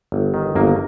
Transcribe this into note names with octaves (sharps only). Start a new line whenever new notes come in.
G1
D#3
G1 A#3